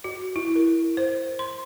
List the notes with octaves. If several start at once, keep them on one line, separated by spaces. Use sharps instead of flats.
F#4
E4
A#4
C5
C6